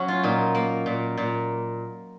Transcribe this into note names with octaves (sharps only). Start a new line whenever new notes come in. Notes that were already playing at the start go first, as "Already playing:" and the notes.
Already playing: F#3 C#4
F4
A#2 D#4
A#3
A#2
A#2